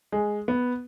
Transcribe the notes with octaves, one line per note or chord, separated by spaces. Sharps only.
G#3
B3